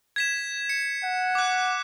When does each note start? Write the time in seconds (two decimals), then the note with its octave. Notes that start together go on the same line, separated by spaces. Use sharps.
0.16 G#6 B6 E7
0.69 C#7
1.04 F#5
1.35 D6 F#6